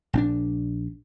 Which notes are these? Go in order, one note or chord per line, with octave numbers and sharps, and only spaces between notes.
A#1 C4 D4